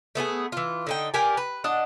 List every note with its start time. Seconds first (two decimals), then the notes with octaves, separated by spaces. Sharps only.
0.15 A3 B3 G4 G#4
0.52 E3 F4
0.87 D3 D#4 G5
1.14 G4 A#4 D5 G#5
1.37 B4
1.64 D4 D#5 F#5